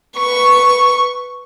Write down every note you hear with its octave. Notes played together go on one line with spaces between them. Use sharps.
B4 C#6